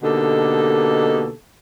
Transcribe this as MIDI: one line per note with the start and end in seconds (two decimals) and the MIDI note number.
0.03 1.32 47
0.03 1.32 50
0.03 1.32 58
0.03 1.32 63
0.03 1.32 67
0.03 1.32 69